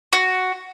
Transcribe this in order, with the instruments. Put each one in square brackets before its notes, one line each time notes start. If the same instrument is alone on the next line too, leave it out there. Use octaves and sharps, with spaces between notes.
[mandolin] F#4